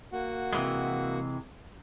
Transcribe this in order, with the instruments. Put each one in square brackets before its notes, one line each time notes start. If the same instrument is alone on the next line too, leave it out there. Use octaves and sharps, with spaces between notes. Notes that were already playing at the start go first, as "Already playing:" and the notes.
[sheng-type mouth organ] A#3 F#4 F#5
[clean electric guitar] C3 E3 G#3